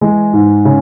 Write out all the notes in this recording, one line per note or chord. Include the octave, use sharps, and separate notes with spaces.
E3 G#3
G#2
C#3